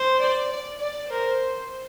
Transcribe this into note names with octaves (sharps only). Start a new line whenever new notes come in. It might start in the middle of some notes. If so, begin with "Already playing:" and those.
Already playing: C5
D5
D5
D5
A#4 C5